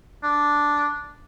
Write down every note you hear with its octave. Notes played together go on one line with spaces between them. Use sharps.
D4